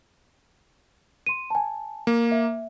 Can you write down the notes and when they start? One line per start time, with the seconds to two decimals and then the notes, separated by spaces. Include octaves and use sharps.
1.26 C6 D#7
1.50 G#5 A5
2.07 A#3
2.32 E5